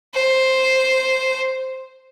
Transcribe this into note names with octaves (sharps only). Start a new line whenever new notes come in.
C5